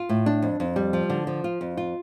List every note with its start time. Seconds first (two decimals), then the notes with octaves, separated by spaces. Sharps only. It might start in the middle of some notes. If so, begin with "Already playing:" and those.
Already playing: F4
0.09 A2
0.26 D4
0.42 F2
0.60 F2
0.76 G3
0.93 F3
1.09 D3
1.27 F3
1.44 F4
1.61 F2
1.77 F4